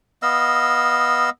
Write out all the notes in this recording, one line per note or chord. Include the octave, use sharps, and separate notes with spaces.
B3 D#5 F5 E6